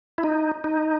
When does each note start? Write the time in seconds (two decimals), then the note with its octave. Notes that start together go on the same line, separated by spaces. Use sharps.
0.18 E4
0.23 D#4
0.64 D#4